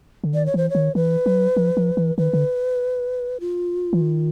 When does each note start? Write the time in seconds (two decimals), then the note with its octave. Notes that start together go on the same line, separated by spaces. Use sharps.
0.24 D3
0.33 D#3 D5
0.46 C#5
0.54 E3 C5
0.70 C#5
0.75 D#3
0.95 E3 B4
1.26 F#3
1.56 F3
1.77 F3
1.97 E3
2.18 D#3 B4
2.33 D3
3.40 F4
3.93 E3
4.01 D#3